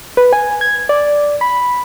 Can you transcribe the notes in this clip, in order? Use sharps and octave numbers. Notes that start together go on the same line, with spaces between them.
B4
G#5
G#6
D5
B5